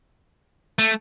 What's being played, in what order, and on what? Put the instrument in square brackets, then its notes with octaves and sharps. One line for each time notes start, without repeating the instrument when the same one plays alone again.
[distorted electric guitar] A3